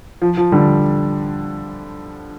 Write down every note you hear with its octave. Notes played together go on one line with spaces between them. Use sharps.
F3
F3
D3 G3